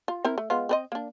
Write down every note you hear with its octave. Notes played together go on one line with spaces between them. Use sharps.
F4
C4 E4 A#4
A3
G#3 B3 F4
C4 B4 D#5
A#3 D4